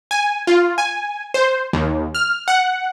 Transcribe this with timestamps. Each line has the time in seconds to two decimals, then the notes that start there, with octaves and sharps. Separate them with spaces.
0.11 G#5
0.47 F4
0.78 G#5
1.34 C5
1.73 D#2
2.15 F6
2.48 F#5